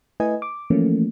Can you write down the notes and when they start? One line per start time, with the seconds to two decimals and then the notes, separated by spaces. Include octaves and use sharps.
0.20 A3 E4 B4 D#5 G#5
0.42 D6
0.70 E3 F3 A3 A#3 C#4